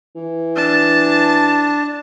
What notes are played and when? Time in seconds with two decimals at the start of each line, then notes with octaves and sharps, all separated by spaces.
0.16 E3
0.57 D4 A5